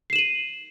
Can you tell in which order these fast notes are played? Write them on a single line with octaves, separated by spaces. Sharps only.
C7 E7 F#7 D#7